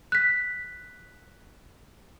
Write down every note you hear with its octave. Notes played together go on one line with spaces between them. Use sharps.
F#6 B6